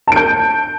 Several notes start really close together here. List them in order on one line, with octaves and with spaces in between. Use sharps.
A5 D7 G6